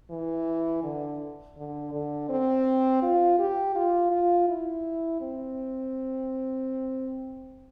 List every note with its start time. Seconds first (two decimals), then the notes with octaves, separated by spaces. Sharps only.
0.10 E3
0.84 D3
1.57 D3
1.93 D3
2.29 C4
3.03 F4
3.39 G4
3.75 F4
4.11 F4
4.48 E4
5.21 C4